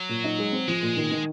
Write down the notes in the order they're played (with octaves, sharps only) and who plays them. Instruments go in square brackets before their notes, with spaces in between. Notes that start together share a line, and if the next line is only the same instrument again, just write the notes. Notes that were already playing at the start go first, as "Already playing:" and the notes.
Already playing: [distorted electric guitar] F#3
[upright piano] A#2
D#4
G#3
C4
[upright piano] F3 [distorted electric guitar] G#3
[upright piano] A#2
D#3
D#3